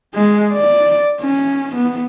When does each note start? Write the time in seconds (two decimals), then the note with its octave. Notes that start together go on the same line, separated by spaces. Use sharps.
0.15 G#3
0.53 D5
1.21 C#4
1.76 B3